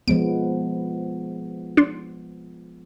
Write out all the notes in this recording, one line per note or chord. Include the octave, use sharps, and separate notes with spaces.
F3 G#3 B3 D7
D4 C6